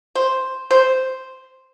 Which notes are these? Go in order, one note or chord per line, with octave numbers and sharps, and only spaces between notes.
C5
C5